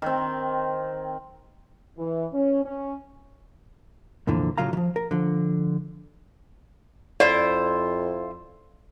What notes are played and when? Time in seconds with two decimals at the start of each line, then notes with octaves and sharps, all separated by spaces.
0.02 D#3 C4
1.98 E3
2.33 C#4
2.64 C#4
4.27 C2 F2 A#2 D3 E3
4.58 A2 C#3 F#3 F4 F5 A#5
4.73 D#3 F3
4.96 A#4
5.11 D3 F3
7.20 F2 E4 F4 C5 D5